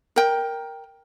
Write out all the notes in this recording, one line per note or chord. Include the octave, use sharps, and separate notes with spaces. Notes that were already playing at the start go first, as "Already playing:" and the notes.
A#4 G5